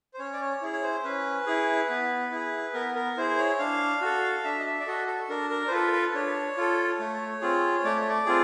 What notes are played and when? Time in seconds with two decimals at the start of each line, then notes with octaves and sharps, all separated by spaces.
0.14 C5
0.19 C#4 C#5
0.33 D5
0.41 C#5
0.62 E4 G#4
0.73 C#5
0.83 C5
1.04 C#4 B4
1.46 E4 G#4
1.90 B3
2.32 E4 G#4
2.74 B3 A#4
2.95 A#4
3.17 E4 G#4 C5
3.38 C#5
3.59 D4 F5
4.01 F#4 A4
4.44 D4 E5
4.59 D#5
4.66 E5
4.80 D5
4.87 F#4 A4 D#5
5.07 A4
5.29 D4 A#4
5.50 A#4
5.68 C5
5.71 F4 A4 B4
5.93 B4
6.14 D4 C#5
6.57 F4 A4
7.00 A3
7.41 C4 F4 G#4
7.84 A3 D5
7.96 C#5
8.09 D5
8.26 C4 F4 G#4